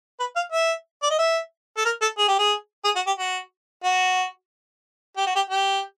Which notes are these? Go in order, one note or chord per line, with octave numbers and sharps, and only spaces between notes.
B4
F5
E5
D5
D#5
E5
A4
A#4
A4
G#4
G4
G#4
G#4
F#4
G4
F#4
F#4
G4
F#4
G4
G4